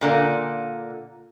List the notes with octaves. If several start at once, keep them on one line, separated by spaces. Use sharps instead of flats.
A#2 D3 A#3